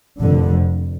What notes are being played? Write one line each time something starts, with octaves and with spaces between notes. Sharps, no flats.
F1 F2 D3